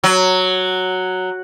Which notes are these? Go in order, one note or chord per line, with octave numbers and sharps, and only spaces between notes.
F#3